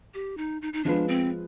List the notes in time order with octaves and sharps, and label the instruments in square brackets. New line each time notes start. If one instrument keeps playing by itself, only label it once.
[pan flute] G4
D#4
D#4
D#4
[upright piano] F3 G#3 B3 F4 B4 [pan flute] D4
[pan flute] C4